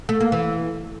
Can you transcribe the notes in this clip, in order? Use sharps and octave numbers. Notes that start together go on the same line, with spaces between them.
A3
A#3
E3